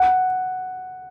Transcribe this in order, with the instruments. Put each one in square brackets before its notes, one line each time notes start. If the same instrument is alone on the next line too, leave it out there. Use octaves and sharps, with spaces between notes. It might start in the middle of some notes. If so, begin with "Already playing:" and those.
Already playing: [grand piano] F#5